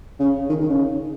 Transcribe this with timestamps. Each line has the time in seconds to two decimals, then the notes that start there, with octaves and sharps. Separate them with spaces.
0.20 C#3
0.49 D#3
0.60 D#3
0.69 C#3